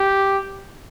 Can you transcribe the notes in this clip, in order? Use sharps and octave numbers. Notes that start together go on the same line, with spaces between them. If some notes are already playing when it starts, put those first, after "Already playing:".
Already playing: G4